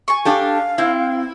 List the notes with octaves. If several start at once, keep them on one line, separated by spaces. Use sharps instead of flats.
G#5 C#6
D4 G4 A4 F5
C4 E4 G5